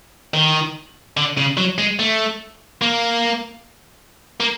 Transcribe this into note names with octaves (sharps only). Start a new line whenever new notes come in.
D#3
D3
C#3
F#3
G#3
A3
A#3
A#3